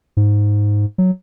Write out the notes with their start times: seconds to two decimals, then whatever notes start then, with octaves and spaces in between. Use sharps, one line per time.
0.17 G#2
0.98 F#3